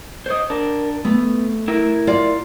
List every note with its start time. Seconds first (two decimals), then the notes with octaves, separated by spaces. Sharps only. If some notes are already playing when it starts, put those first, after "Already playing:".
0.26 C5 C#5 D#5
0.50 D4 A#4
1.05 A3 B3
1.68 E4 A#4
2.07 F4 D5